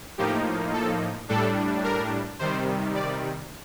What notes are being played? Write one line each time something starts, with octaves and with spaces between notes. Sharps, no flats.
A2 F3 A#3 D#4 G4
A4
A2 G3 D4 A4
A#4
C3 D#3 G3 C5
D5